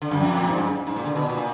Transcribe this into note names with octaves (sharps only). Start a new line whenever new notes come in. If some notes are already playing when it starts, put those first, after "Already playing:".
D3
F#2
F2
A#2
G#2
F#2
G#2
A#2
D3
B2
A#2